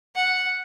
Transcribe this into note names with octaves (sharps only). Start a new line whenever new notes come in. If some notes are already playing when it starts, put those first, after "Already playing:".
F#5